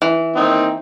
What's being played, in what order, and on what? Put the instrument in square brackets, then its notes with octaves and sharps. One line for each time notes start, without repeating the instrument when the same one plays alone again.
[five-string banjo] E3
[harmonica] A#3 C4 D#4